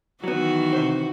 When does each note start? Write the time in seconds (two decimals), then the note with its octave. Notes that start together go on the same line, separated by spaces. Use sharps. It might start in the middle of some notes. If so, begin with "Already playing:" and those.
0.24 D#3 E3 F#3 B3 F#4
0.73 C3 C5